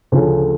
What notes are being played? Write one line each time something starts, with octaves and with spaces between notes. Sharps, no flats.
D2 C#3 F3 A3 C#4